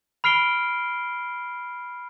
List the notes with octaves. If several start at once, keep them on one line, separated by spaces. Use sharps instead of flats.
B5 F6 C7 D7 G7